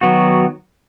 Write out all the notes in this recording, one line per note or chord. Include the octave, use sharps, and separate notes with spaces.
D#3 F#3 B3 F#4